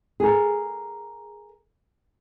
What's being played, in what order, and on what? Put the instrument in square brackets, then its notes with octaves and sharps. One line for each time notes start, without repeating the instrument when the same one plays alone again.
[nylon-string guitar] G#4 A#4